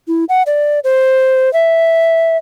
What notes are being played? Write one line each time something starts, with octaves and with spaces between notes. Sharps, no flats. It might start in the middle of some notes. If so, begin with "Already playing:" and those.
E4
F#5
D5
C5
E5